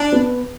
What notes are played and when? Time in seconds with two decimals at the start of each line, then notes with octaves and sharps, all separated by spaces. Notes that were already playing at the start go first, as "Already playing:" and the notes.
Already playing: D4
0.12 B3